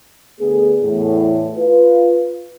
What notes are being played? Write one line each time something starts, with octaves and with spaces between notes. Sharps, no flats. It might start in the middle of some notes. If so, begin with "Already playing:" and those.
D3 A3 B3 G#4
E2 A2
F4 B4